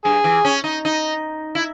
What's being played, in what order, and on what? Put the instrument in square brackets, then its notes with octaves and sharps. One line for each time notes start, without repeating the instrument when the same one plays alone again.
[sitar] G2 [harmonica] G#4
[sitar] E3
C#4
D#4
D#4
E4